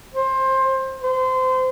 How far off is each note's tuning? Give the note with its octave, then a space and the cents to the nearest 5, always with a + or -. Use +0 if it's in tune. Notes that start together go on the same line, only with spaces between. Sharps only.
C5 +20
C5 -25